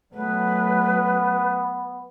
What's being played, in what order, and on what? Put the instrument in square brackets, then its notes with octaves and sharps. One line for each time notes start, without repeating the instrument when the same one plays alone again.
[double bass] F#3 A3 [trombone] B3 [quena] B4